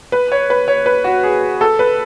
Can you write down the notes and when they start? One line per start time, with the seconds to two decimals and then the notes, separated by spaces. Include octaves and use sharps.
0.12 B4
0.32 C#5
0.50 B4
0.68 C#5
0.86 B4
1.04 F#4
1.23 G#4
1.61 A4
1.79 B4